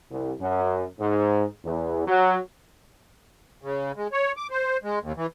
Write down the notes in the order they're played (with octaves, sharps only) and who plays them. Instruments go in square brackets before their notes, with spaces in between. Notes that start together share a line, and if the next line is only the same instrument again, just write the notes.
[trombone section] C2
F#2
G#2
E2
F#3
[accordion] C#3
G#3
C#5
D6
C5
G#3
D#2
E3